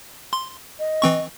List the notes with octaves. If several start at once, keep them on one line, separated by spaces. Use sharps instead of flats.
C6
D#5
E3 C4 C#6